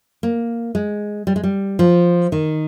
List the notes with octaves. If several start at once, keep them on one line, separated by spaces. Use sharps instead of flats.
A#3
G#3
G3
G#3
G3
F3
D#3